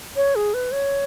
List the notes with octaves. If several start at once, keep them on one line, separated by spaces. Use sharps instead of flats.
C#5
G#4
B4
C#5